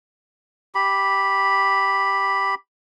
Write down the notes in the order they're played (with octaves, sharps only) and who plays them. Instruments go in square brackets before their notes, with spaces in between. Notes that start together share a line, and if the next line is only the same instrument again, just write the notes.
[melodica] G4 B5